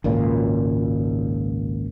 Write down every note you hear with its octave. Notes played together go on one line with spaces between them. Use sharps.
G#1 C#2 A#2